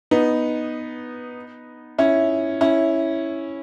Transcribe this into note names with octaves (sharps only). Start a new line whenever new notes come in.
B3 D#4
C#4 E4
C#4 E4